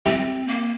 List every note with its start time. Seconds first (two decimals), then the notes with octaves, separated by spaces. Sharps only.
0.06 C4 E4 G4
0.48 A#3